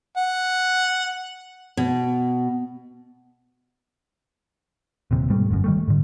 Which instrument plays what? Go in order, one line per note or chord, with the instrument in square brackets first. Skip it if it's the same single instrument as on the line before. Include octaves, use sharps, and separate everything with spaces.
[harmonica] F#5
[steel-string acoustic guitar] B2
[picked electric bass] D#1 D#2 C3
G#2 B2 G3 A3
G1 F#2
D#3 G3 A3
G#2 D3